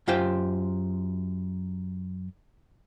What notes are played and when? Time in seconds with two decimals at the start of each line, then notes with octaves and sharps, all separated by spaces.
0.08 F#2 F4 G4 C5 G5